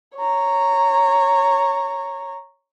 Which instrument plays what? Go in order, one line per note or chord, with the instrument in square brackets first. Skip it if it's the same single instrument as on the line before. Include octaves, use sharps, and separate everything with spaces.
[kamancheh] C#5 A#5